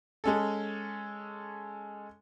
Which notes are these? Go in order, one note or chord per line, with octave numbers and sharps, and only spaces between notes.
G#3 C#4 A4